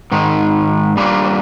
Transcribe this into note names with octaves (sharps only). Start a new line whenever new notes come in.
G#2 D#3 G#3
G3 A#3 D4 F4